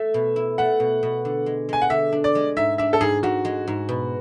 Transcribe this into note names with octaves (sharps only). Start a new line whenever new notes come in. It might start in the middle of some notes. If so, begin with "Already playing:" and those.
Already playing: A3 E5
B2
E4
A3 F#5
B2
B2
D3
G#3
G#3 G#5
F#5
D3 E5
D4
D5
G#3
G#2 E5
D4 E5
A4
G#2 G#4
G#2 F#4
G#3
G#2
B2